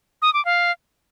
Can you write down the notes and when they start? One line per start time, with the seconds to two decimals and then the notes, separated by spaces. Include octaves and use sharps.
0.22 D#6
0.34 D6
0.45 F5